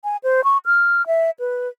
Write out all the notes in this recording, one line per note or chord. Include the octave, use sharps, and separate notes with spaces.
G#5
C5
C#6
F6
E5
B4